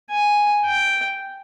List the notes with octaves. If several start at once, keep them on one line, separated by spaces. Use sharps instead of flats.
G#5
G5